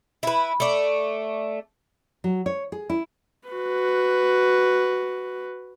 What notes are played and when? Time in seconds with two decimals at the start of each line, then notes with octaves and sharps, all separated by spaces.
0.23 E4 B4
0.60 A3 D5
2.24 F#3
2.46 C#5
2.72 G#4
2.90 E4
3.48 F#4 B4